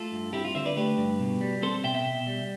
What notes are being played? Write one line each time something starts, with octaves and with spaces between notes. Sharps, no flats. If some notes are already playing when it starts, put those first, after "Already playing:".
Already playing: A3 F4 A4
G2
C4 E4 G4
F4
D3 C5 E5
B4 D5
A3 G4 B4
G2
B2
G3
C4 A4 C5
B2 E5 G5
E5 G5
B2
G3